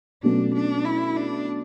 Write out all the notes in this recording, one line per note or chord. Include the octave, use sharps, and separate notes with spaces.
B2 F#3 A3 C#4 D4
D4
E4
D4